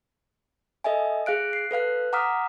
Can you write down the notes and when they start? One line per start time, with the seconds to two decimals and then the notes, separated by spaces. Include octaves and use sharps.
0.84 A4 D#5 E5 G#5
1.26 G#4 F5 F#6 D7
1.53 C7
1.71 A4 B4 F5 F#6
2.13 F#5 A#5 D6 D#6 F6 B6